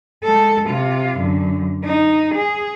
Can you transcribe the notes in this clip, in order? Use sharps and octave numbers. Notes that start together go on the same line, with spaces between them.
G#3 A4
C3 F4
F#2 D3
D#4
G#4